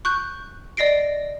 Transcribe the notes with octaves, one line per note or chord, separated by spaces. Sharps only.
C#6 F#6 G6
D5 D#5 A#6 C7 D7